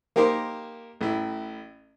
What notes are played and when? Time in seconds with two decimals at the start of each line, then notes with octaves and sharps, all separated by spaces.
0.16 A#3 D#4 G4 A#4 C5
1.01 A1 E4